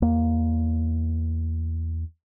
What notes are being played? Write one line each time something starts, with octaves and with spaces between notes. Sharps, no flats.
E2 A#3